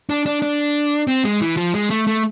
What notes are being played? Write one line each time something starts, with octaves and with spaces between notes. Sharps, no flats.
D4
D4
D4
C4
G#3
E3
F3
G#3
A3
A3